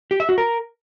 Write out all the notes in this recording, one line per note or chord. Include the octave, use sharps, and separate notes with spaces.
G4
E5
F#4
A#4